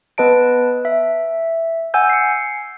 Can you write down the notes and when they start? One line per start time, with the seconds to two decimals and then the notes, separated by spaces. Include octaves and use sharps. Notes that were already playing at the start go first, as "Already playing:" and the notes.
0.18 B3 B4 D#5 A5 D7
0.85 E5
1.94 F#5 G#5 E6 G6
2.10 C7 C#7